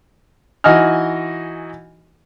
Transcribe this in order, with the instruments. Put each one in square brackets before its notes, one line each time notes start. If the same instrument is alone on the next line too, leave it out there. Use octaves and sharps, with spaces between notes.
[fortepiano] E3 D#4 F#4 D#5 G#5 F6